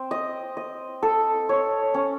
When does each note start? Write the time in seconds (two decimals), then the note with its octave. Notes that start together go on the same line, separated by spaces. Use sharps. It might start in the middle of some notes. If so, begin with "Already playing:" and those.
Already playing: C4
0.11 D#5
0.57 D#5
1.03 A4
1.49 C#5
1.94 C#4